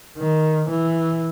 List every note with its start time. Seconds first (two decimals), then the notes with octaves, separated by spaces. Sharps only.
0.18 D#3
0.69 E3